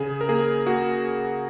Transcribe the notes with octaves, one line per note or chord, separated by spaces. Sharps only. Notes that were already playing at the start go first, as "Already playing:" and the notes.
Already playing: C#3 G#4
A#4
A#3 G#4
A#3 F#4